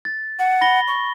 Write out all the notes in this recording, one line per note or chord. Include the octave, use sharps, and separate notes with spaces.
A6
F#5
B5 A#6 G7
C#6